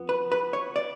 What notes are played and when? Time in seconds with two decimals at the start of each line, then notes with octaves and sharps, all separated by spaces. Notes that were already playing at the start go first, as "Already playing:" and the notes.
Already playing: F2 F3 B3
0.09 B4
0.32 B4
0.53 C#5
0.76 D5